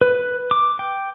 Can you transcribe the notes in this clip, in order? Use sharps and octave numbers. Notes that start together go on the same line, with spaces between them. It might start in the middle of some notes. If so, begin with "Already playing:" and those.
B4
D6
G5